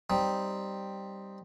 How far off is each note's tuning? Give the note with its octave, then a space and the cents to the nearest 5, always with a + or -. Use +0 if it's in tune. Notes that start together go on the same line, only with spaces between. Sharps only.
G3 +0 C4 +0 D#4 +0